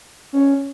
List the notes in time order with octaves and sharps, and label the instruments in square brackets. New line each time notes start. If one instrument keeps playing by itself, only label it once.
[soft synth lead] C#4